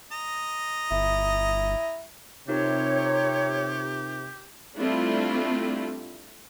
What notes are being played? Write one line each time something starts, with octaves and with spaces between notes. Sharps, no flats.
D#5 A#5
G1 E4
C3 D#4 F4 G4 A#4 C#5
G3 A3 C4 D4 E4 F4